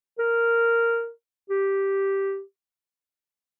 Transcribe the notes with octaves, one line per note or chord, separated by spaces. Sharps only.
A#4
G4